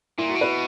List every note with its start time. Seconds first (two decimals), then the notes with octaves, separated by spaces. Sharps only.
0.18 A#2 E4
0.29 F#4
0.35 B2
0.41 B4